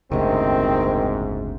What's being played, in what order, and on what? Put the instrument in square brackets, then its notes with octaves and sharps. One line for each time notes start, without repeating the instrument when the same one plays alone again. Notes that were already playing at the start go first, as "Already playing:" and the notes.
[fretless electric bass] F#1 D2 C3 [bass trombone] G#2 [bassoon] D#3 [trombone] C4